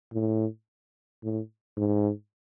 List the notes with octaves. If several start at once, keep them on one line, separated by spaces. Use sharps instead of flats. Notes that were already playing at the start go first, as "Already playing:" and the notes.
A2
A2
G#2